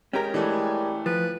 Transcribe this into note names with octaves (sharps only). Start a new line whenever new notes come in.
G#3 C#4 G4 A#4 G5 A#5
E3 G3 A3
F3 B4